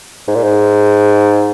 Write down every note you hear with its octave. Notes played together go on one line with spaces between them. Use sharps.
G#2
A#2
G#2